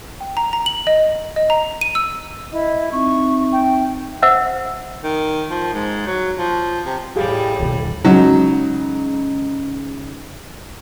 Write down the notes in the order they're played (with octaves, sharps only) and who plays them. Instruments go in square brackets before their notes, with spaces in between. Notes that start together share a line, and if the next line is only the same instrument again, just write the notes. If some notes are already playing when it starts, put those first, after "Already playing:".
[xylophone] G5
A#5
A#5
F#7
D#5
D#5
A#5
D#7
E6
[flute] E4 [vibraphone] D#5
[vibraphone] C4 D#4 E5 [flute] C#6
[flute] G5
[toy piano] C5 E5 F#5 E6
[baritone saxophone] D#3
F3
G#2
F#3
F3
C3
[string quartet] A2 G3 [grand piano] G4 G#4 F5
[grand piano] D#1 [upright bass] E2 B2
[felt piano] C#3 G#3 D#4 [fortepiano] F#3